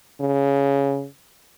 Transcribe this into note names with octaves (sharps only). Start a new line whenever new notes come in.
C#3